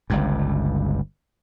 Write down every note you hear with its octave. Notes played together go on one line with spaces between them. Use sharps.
G1 C#2 G2